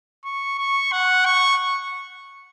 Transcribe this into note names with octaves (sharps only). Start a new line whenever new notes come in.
C#6
C#6
F#5
C#6